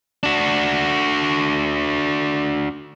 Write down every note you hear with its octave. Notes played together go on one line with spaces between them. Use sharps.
D4 F#4